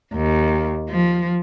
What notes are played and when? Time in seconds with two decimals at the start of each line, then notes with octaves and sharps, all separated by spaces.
0.13 D#2
0.90 F3